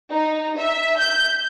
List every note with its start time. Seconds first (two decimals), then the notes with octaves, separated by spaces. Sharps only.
0.11 D#4
0.58 E5
0.99 G6